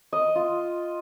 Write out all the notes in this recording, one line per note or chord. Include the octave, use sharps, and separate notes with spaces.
D#5
F4